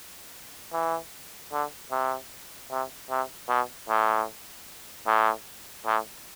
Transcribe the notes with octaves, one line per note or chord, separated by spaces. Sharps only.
E3
D3
C3
C3
C3
B2
A2
A2
A2